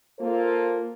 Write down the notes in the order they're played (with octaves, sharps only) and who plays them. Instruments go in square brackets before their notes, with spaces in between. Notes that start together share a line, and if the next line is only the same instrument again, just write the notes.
[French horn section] A#3 F4 A4 C5